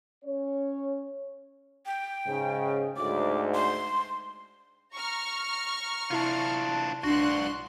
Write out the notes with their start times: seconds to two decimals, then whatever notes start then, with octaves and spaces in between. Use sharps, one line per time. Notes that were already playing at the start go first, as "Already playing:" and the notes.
0.24 C#4 C#5
1.86 G5
2.26 G#2 C#3
2.97 D2 G#2 D6
3.55 C6
4.94 A#5 C#6 F6
6.11 C3 D4 E4 F4 A5
7.04 A#1 G2 D4 F#4 C6 F#6